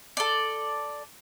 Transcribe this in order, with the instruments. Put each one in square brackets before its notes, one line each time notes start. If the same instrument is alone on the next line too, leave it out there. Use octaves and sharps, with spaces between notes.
[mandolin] A4 D5